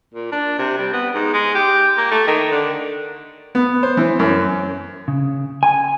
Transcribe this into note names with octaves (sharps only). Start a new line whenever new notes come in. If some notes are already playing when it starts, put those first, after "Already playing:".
A#2
D4
C3
G3
B3
G#2
G#3
G4
A#3
A3
D#3
D3
B3
C5
E3
F#2
C#3
G#5